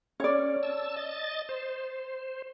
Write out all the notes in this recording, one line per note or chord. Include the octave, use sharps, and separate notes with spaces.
C#4 C#5 D5
A5 E6
D#5 A6
C5